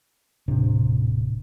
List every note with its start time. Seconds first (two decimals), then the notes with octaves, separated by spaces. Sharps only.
0.48 D#1 A2 C3 D4